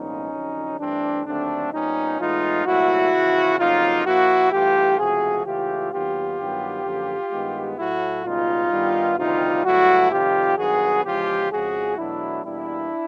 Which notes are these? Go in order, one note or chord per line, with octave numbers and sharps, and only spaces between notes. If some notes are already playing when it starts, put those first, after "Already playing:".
Already playing: C2 A#2 F3 G#3 B3 C#4 D#4
F2 D3 F#3
G2 E3 A3 C4 D4
D#2 D3 F#3 A3 C4 D4
A#2 G3 B3 C#4 D#4
A2 E3 G#3 B3 D#4 F4
C2 A#2 F#3 A3 E4 F#4
E2 C#3 F3
F2 C#3 F#3 A#3 D#4 F4
A#2 F3 A#3 E4 F#4
G2 E3 A3 F4 G4
C#2 C3 F3 A3 F#4 G#4
C#2 C#3 E3 A3 F4 G4
D#2 D#3 F#3 B3 F4 G4
G2 D#3 F#3 B3
F#2 D3 F3 A#3
G2 D#3 G#3 B3
A2 F#3 A3 E4 F#4
C#2 B2 G3 D#4 F4
G2 D#3 G3 B3
D2 C3 D#3 G3 D#4 F4
G2 D3 F#3 A3 E4 F#4
F2 C3 D#3 G3 F4 G4
G2 D#3 F#3 B3 F#4 G#4
E2 C#3 F3 G#3 F4 G4
F2 C#3 F3 G#3 F#4 G#4
E2 B2 F#3 A3 D4 E4
E2 B2 G3 A#3 D4 E4